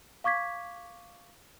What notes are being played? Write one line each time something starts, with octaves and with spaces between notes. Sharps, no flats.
F5 C#6 D6 G#6 B6